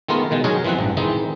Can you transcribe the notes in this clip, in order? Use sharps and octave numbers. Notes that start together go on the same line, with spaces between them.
D#3 G#3 A3 B3 F4 A#4
B2 D#3 G#3
F#3 G#3 D#4 F#4 G#4 A#4
E3 F3 G#3 C4 F#5
A1 G2
D#3 E3 G#3 C4 D#4